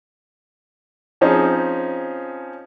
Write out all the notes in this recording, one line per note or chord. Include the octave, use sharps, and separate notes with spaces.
F3 C4 C#4 D#4 G#4